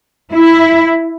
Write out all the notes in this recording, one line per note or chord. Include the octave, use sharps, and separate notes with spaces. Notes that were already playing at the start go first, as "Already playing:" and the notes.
E4